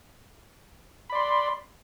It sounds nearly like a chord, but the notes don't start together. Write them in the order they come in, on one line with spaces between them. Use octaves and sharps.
B5 D5 C6